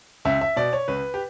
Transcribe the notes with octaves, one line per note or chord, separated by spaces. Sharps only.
C#2 E5
E5
B2 D5
C#5
C#2 B4
G4